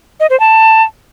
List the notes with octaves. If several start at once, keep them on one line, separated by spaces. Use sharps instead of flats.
D#5
C5
A5